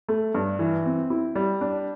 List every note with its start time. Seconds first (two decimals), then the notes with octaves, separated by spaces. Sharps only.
0.09 A3
0.35 G2
0.59 E3
0.86 C4
1.10 E4
1.36 G3
1.61 D4